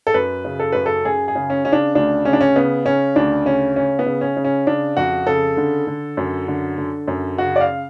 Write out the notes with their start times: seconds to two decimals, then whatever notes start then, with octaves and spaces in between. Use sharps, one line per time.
0.07 A4
0.14 F#2 B4
0.45 C#3
0.60 A4
0.73 F#2 B4
0.86 A4
1.05 F#2 G#4
1.28 G#4
1.35 C#3
1.50 C#4
1.65 C#3 C#4
1.73 D4
1.95 D2 D4
2.25 C#3 C#4
2.33 D4
2.41 C#4
2.56 C#3 B3
2.85 C#3 C#4
3.16 D2 D4
3.45 C#3 C#4
3.76 C#3 C#4
3.99 B3
4.06 C#3
4.21 C#4
4.37 C#3
4.44 C#4
4.67 C#3 D4
4.97 F2 F#4
5.26 C#3 A4
5.57 D3
5.87 D3
6.17 F#2
6.48 D3
6.78 D3
7.08 F#2
7.38 C#3 F#4
7.56 D5
7.60 F5